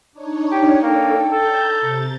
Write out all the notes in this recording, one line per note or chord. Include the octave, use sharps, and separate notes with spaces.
D4 D#4 C#5
G4
A#3 A4 G5
A4 A#5 G6
C3 A6